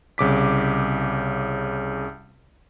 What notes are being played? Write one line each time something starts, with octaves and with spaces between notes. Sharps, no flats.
C2 C#3 D6 B6